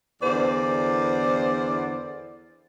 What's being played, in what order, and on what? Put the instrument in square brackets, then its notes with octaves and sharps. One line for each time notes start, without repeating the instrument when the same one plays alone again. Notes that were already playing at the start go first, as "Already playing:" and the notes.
[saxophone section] E2 D3 C5 D5